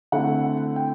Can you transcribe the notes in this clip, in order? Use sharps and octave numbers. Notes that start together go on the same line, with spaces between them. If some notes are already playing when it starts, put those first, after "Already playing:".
D3 A3 C4 E4 F#5
G5